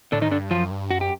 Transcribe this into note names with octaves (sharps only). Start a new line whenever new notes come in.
A2 D3 D4
D#3 D#4
G#2
G2 D3 D4
F#2 F3 F4
G2
F#2 F#4
G4